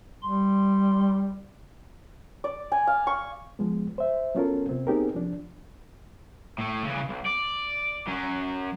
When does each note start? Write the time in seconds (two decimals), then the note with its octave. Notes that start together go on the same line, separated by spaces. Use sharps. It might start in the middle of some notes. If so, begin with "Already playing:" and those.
0.23 G3 C6
2.44 D5
2.72 G#5
2.87 F5
3.07 C#6
3.59 F3 G#3 B3
3.98 C5 E5
4.35 F#3 B3 C#4 F4 A4 A#4
4.69 C3 B3 C4
4.87 B3 C4 D#4 G4 G#4 A#4
5.14 C2 F3 D4
6.58 A2 A3
6.85 C#3 E3
7.09 B1
7.26 D5
8.07 F#3 C#4